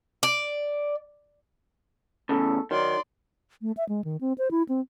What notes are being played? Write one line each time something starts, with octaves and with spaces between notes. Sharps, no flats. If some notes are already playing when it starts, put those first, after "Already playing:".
D5
E2 A2 C#3 A4
D#3 F#3 D5 C6
A3
E5
G#3
D#3
C4
C5
E4
C4